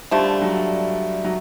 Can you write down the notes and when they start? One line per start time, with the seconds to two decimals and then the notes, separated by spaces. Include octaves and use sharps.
0.11 D3 F3 G3 A3
0.42 F#3
1.24 F#3